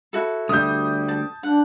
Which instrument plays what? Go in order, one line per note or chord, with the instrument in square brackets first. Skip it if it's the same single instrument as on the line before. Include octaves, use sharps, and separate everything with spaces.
[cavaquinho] E4 F#4 A4
[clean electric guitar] D2 G3 [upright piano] D#6 G6
[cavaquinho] A5
[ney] D4 [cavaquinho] F#5